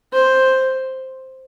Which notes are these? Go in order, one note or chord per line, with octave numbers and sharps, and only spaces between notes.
C5